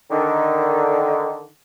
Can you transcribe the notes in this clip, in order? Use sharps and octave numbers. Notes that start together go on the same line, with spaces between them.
D3 D#3